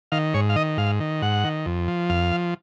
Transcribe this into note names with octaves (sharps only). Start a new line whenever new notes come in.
D#3 F5
G#2 C#5
F5
D#3 D#5
G#2 F5
D#3
G#2 F#5
D#3
F2
F3
F2 F5
F3